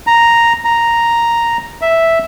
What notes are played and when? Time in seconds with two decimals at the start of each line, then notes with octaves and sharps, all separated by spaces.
0.07 A#5
0.65 A#5
1.82 E5